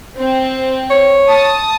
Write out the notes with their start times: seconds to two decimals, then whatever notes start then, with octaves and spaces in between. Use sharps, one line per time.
0.18 C4
0.90 C#5
1.28 A5 D#6